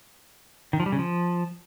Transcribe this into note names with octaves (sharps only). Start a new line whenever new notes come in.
D#3
F3
G3
C#3
F3